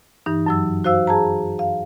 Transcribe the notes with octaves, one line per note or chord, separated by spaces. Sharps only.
G2 E3 D#4
F#2 F#3 E6
F#4 C5 F5 E6
G#4 A5 A#5
F5